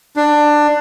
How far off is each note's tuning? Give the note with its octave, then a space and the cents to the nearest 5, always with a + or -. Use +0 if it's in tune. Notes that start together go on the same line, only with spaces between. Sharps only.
D4 +15